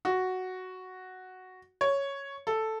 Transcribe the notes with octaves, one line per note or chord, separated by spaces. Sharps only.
F#4
C#5
A4